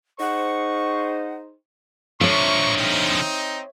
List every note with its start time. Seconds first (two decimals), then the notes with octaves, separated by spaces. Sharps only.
0.20 D#4 G#4 C5 F#5 C#6
2.21 D3 F3 C#5 E5 A#5 C6 C#6
2.78 C4 D#4